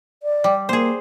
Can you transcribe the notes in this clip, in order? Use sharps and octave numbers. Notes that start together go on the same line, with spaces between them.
D5
G3
A#3 G#4 C5